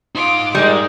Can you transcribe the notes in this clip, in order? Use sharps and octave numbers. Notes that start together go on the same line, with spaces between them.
D#4 F4 C5 D6
A#2 G3 G#3 A#4